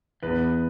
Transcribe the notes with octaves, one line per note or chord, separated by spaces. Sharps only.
E2 B3 B4